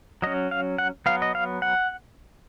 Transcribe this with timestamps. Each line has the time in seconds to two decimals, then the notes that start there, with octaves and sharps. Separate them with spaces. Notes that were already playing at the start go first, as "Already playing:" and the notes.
0.22 F#3 C#4 D#5
0.51 F5
0.78 F#5
1.06 F#3 B3 F5
1.22 D#5
1.35 F5
1.62 F#5